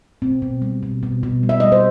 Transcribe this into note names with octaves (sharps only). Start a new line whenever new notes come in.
B2 C4
B2
G3
B2
B2
B2
G3
E5
G3 D#5
C5